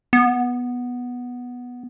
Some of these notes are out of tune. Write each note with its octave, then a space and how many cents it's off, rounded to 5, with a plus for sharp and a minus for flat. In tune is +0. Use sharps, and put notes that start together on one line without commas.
B3 -5